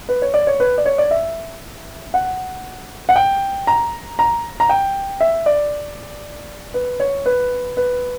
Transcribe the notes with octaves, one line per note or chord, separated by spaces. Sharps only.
B4
C#5
D5
C#5
B4
D5
C#5
D5
E5
F#5
F#5
G5
A#5
A#5
A#5
G5
E5
D5
B4
C#5
B4
B4